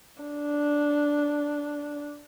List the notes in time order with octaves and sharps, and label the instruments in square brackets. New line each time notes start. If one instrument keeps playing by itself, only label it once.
[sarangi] D4